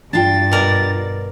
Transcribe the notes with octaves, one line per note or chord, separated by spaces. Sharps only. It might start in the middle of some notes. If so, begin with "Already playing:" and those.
G2 D4 F4 G5 A6
B2 A#4 D5